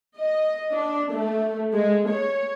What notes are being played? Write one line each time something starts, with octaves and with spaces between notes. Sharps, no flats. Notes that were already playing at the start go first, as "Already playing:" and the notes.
D#5
D4
A3
G#3
C#5